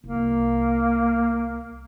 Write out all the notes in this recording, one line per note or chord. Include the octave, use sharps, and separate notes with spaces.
C2 A#3